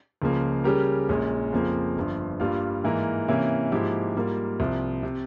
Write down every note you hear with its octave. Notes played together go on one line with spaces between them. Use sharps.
C#2 C#3 F3 A#3
C#3 G3 C#4 G4 A#4
A#1 A#2 G#3 C#4
F2 C#3 F3 A#3
G1 G2 F3
G2 G3 A#3 F4
G#2 E3 A#3 E4 A#4
C3 E3 A#3 C#4 E4
G#2 F3 A#3 E4 G4
G#2 G3 A#3 F4 A#4
C2 C3 F3
C3